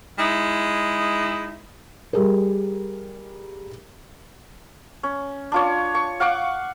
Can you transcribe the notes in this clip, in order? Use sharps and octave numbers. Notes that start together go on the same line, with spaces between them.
G#3 D#4 E4
G3 G#4 A#4
C#4
D4 F4 C#5
C#6
F5 F#5 C#6 D6